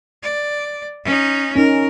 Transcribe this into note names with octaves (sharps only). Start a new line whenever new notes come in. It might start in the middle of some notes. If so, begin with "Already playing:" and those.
D5
C#4 D#4
C#4 D#4 A#4